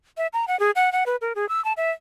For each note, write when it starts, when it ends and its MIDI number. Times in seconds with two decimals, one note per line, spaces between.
0.17 0.27 76
0.33 0.45 82
0.48 0.58 78
0.60 0.71 68
0.76 0.92 78
0.92 1.04 78
1.06 1.16 71
1.21 1.33 70
1.35 1.48 68
1.49 1.63 88
1.65 1.73 81
1.77 1.91 76